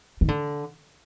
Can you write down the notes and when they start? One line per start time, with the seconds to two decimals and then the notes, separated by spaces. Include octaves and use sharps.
0.21 D#3
0.28 D3